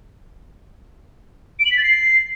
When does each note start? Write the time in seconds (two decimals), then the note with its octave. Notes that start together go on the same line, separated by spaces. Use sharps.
1.59 D7
1.65 F#7
1.71 B6
1.77 A6
1.83 C7